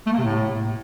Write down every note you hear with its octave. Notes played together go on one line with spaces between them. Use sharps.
A3
A#3
C3
A2